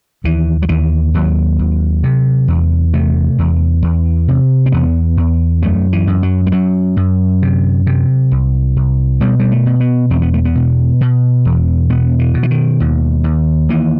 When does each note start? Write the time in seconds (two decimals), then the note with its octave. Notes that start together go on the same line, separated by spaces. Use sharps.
0.24 D#2 E3
0.62 F#3
0.69 D#2 E3
1.14 D#2 F#3
1.59 D#2
2.04 C3
2.48 E2
2.93 C3 A3
3.39 E2
3.83 E2
4.28 C3
4.66 C4
4.72 E2 B3
5.17 E2
5.63 F#2 A3
5.92 E3
6.07 F#2
6.23 F#3
6.46 G3
6.52 F#2 F#3
6.97 F#2
7.42 C3
7.87 C3
8.32 C2
8.76 C2
9.20 B2 G3
9.40 G3
9.52 A3
9.66 B2
9.80 B3
10.10 E2 C4
10.22 B3
10.34 A3
10.45 B3
10.55 B2
11.01 B2
11.45 E2
11.90 B2 B3
12.19 E3
12.34 B2
12.43 E3
12.50 D#3
12.80 D#2
13.24 D#2
13.69 D#2 E3